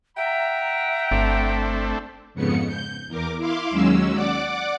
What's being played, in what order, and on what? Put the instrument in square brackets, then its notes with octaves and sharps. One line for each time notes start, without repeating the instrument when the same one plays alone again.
[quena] E5 [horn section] F#5 G5 A#5
[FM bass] G1 [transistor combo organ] A3 C4 D4
[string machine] F2 G#2 C#3 B3 C#7
G6
E2 A#4 D6
E4 F5 C6 D6
D#2 F#3 G#3 C#4 E6
D5 F#5 D6